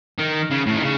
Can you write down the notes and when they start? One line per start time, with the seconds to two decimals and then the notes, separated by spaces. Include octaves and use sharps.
0.19 D#3
0.51 C#3
0.67 A2
0.76 D#3
0.82 C#3